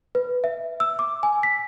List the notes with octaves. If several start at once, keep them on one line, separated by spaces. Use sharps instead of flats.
B4
E5
E6
D6
G#5
B6